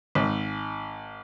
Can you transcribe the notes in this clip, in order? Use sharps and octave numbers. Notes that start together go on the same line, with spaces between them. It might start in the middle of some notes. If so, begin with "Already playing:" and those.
G#1